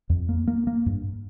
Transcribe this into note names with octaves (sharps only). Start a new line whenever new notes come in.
F2
A#3
A#3
A#3
G2